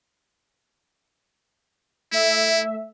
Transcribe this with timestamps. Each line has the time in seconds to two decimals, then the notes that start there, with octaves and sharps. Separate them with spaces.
2.12 A3 E4 E5